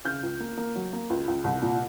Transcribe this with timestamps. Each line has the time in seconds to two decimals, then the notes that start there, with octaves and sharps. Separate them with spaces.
0.05 C#3 F6 G6
0.23 C#2
0.40 A#3
0.57 A#3
0.75 F#3
0.93 A#3
1.10 C#2
1.28 C#2
1.44 C2
1.62 A#2